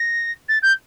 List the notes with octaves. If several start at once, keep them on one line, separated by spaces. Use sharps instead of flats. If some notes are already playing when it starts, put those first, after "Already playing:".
Already playing: A#6
A6
G6